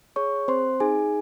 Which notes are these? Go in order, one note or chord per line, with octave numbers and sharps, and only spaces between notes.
G#4 C#5 C#6
C4 C5 C6
D#4 G#4 G#5